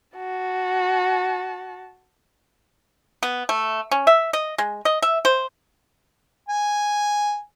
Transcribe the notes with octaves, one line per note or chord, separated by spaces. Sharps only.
F#4 A5
B3
A3
C#4
E5
D#5
G#3
D#5
E5
C5
G#5